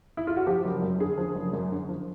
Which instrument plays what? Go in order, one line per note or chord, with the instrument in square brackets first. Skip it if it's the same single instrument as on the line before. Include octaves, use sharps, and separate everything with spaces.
[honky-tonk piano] E4
F4
F#4
F3 G4
F#1
F#2
D3 G#4
F3
F#1
F#2
D3
F3